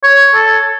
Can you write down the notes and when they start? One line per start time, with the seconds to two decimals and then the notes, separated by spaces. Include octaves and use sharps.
0.03 C#5
0.34 A4